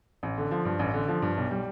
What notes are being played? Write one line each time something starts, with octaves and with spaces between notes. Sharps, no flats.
A1
D3
F3
G2
A1
D3
F3
G2
B1
G3